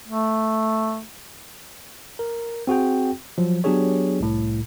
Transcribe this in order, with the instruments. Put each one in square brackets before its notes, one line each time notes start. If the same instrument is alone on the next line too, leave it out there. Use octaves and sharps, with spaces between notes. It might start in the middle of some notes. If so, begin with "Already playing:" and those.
[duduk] A3
[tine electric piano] A#4
C4 F#4 G#4 G5
F3 F#3
F#3 B3 D4 G4 G#4 C#5
C2 A2